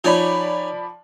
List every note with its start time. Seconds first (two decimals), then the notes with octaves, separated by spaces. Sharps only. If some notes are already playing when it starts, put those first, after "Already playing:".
0.04 F3 D#4 C#5 D5 G#5 B5